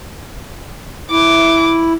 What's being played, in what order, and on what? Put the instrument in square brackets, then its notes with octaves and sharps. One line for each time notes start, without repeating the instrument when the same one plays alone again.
[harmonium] E4 [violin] D6